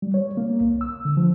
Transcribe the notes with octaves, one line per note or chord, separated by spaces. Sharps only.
G3
C#5
A#3
C2
E6
D3
F3